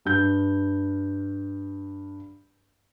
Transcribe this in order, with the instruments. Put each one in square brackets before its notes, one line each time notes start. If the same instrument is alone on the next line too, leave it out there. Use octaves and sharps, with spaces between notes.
[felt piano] G2 G6